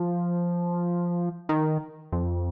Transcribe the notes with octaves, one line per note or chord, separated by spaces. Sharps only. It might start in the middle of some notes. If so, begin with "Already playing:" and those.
Already playing: F3
D#3
F2